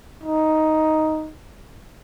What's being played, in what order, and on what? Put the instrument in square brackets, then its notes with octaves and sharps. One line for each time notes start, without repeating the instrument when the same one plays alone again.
[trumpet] D#4